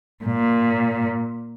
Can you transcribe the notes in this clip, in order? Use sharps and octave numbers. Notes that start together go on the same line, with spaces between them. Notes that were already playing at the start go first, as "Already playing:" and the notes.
A#2